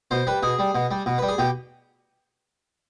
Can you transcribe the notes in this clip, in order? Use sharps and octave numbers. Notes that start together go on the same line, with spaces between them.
B2 C5
G3 B4
B2 G#4
G3
B2
G3
B2
G3 B4
G#4
B2 G4